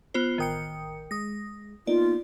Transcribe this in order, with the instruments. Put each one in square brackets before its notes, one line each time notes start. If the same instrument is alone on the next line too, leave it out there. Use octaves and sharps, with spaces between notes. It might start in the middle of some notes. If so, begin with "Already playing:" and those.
[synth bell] B3 F4 C5
[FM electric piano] A1 A#4 G5 [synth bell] D#3 D#6 C#7
[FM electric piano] G#3 [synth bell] D#6 A#6
[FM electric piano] A#3 B3 D#4 [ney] F4 [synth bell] D5